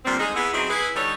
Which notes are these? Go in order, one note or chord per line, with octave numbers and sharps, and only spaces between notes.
A#2 D3 G3 C4
G#3 D#4 G#4
B3 E4 G#4
F#3 C4 C#4 D#4 E4 G#4
E4 G#4 B4
D3 G3 D#4 A4 C#5